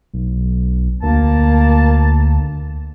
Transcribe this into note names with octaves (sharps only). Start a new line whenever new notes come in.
B1
D2 A#3 A5